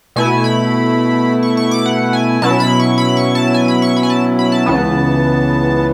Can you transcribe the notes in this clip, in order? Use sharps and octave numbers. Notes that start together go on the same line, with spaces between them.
B2 A3 E4 G#5
B5
C#6
C#6
D6
F#5
G#5
B2 F#3 C#4 E4 A5
B5
C#6
B5
C#6
A5
G#5
B5
C#6
B5
G#5
A5
B5
A5
C#2 C#3 E3 B3